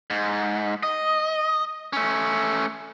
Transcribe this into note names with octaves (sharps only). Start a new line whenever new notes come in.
G#2
D#5
A3 C#4